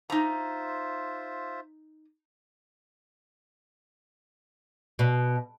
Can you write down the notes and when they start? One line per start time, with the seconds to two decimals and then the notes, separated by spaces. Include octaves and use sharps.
0.10 D#4 F4 C5 E5 A#5
4.99 B2